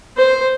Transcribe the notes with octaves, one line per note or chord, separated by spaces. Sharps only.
C5